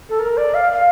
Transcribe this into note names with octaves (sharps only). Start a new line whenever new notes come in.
A4
A#4
D5
F5
F5